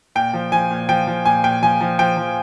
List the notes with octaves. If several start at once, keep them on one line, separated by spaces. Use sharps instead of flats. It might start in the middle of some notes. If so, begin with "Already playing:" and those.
A#2 G5
F3
F3 G#5
A#2
F3 G5
F3
A#2 G#5
A#2 G5
F3 G#5
F3
F3 G5
F3